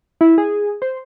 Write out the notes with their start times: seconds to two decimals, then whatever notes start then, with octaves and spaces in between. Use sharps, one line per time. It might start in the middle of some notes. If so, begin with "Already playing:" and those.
0.21 E4
0.38 G#4
0.82 C5